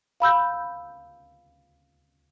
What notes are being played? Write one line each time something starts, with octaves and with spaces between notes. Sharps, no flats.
F5 B5 E6 G6